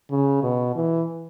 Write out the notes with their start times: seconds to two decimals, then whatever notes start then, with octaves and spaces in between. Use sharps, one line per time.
0.10 C#3
0.43 B2
0.75 E3